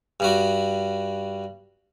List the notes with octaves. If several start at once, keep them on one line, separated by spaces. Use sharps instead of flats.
G2 G3 F#4